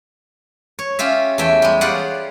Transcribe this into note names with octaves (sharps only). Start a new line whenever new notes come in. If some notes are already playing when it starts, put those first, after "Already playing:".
C#5
C#4 F4 G4 E5
E2 A3 E5 G5
G3 G#3
F4 G4 G#4 C#5 D5 F#5